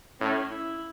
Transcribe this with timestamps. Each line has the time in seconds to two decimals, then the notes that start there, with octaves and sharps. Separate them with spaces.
0.20 A2 C#4
0.52 E4